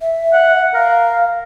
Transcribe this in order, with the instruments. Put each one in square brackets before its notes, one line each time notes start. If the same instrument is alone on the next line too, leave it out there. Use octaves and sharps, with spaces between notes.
[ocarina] E5
[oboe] F#5
[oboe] A#4 [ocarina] F5